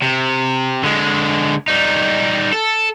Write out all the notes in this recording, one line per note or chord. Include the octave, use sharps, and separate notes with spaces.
C3
D3 G#3
G3 D#4
A4